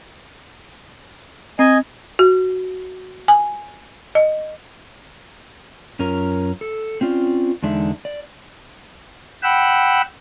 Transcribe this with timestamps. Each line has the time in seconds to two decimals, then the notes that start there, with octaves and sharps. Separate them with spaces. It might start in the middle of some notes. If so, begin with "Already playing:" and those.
1.59 C4 D#5 G#5
2.19 F#4
3.28 G#5
4.15 D#5
5.99 F#2 C#4 F4 A#4
6.61 A4
7.01 C4 C#4 F4 D5
7.62 E2 D3 G#3 D4 D#4 E5
8.05 D5
9.43 F#5 G5 B5 E6